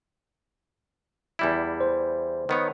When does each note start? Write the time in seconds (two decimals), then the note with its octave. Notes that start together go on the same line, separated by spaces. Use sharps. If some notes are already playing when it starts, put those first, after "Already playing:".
1.39 E2 G3 E4
1.80 C5
2.49 D#3 B3 C#5